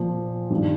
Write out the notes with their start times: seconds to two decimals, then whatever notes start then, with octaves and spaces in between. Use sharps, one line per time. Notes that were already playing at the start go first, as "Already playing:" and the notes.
Already playing: A#2 F3
0.50 G2 D#3